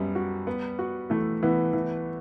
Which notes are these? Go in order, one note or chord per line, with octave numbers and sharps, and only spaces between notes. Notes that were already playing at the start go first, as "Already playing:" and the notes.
Already playing: F#2 G3 B3
F#4
B3
F#4
E3 A3
E3 B3
E3